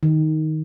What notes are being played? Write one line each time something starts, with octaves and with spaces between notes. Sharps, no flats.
D#3